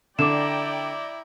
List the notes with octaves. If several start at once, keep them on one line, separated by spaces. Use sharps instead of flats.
D3 E4 D5 G5 A#5 D6 E7